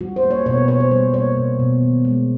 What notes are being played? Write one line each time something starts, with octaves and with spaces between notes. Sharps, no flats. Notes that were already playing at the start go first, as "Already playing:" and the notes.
G3 F#4
C5
A#3
C#5
B2 C#5
B4
B2 C#5
C5
G3 C5
A#3 C#5
B2
B2
D#3
G#3